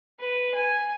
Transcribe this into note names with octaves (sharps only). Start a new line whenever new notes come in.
B4
G#5